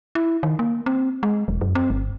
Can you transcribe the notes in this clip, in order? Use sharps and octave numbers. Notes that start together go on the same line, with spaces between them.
E4
D#3
A#3
C4
G#3
E1
F#2
C4
G1